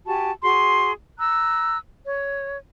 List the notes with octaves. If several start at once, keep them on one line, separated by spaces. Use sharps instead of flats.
F#4 G4 G#5 A5
F#4 G#4 C6
A#5 E6 F#6
C#5